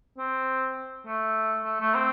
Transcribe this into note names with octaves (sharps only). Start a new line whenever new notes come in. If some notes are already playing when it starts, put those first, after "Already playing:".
C4
A3
A3
A3
C4